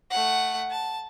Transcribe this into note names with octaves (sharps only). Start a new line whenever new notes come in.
A3 F#5
A5